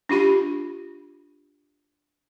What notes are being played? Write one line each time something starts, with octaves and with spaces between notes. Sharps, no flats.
D4 F4 G4 B5